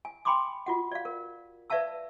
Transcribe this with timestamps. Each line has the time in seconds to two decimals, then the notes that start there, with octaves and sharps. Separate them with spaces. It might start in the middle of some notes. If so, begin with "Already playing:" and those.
0.05 G#5
0.25 G5 G#5 B5 C6 D6 D#6
0.66 F4 F#4 F#5
0.92 D5 F5
1.05 A#4
1.70 B4 D5 E5 F5 A5 E6